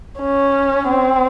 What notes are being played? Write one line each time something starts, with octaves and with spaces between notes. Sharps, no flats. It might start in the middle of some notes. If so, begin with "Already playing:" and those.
C#4
C4